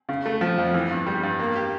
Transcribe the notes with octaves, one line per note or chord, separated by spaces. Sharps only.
C#3
A3
F3
F2
E3
G2
G3
G2
A#3
G4